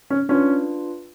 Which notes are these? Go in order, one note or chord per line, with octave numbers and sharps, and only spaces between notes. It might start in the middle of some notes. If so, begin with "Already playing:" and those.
C#4
C#4 D4 F4 B4